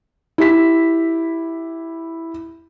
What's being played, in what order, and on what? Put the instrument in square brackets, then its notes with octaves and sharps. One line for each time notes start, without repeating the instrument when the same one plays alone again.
[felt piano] E4 G4 B6